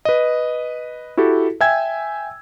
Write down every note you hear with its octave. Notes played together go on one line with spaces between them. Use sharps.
B4 D#5
E4 F#4 G4 A4
E5 G5 G#5 E6 G#6